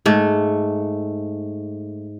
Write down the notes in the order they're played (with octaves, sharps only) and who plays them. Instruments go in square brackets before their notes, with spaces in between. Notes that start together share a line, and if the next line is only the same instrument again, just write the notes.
[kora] G#2 A3